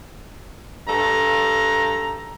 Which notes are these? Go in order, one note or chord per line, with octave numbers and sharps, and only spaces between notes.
G2 A4 A#5